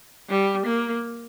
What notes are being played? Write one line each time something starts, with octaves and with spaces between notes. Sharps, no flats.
G3
A#3